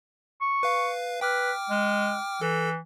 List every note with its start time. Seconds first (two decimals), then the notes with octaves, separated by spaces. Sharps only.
0.41 C#6
0.63 B4 F5
1.21 B4 G5 D6 F6
1.70 G#3
2.41 E3 A4